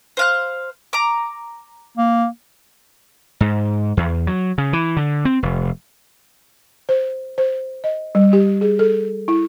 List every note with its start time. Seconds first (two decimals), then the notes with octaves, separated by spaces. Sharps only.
0.17 C5 F5 F#6
0.93 A#5 D6
1.98 A#3
3.41 G#2
3.97 E2
4.27 F#3
4.58 C#3
4.73 E3
4.97 D3
5.25 C4
5.43 F1
6.89 C5
7.38 C5
7.84 D#5
8.15 G3
8.33 G4
8.61 G#4
8.79 A4
9.28 E4